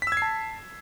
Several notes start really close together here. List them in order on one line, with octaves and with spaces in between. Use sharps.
B6 E6 G#6 C7 A5